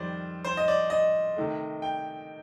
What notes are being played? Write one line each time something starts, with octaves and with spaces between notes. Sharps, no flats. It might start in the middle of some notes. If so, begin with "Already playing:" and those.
Already playing: F2 D#3 G3 C5 D5
C5
D#5
D5
D#5
C3 D#3 A3
G5